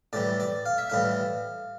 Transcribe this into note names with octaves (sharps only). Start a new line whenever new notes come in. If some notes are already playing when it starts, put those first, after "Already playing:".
A2 E3 G3 D5
D5
F5
E5
A2 E3 G3 F5